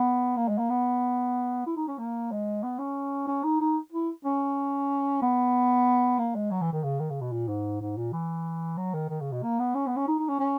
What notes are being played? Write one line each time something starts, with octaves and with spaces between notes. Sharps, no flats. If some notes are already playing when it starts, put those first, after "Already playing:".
Already playing: B3
A#3
G#3
A#3
B3
E4
D#4
C#4
A#3
G#3
B3
C#4
C#4
D#4
D#4
E4
C#4
B3
A#3
G#3
F#3
E3
D#3
C#3
D#3
C#3
B2
A#2
G#2
G#2
A#2
E3
F#3
D#3
D#3
C#3
B2
A#3
B3
C#4
B3
C#4
D#4
D#4
C#4
C#4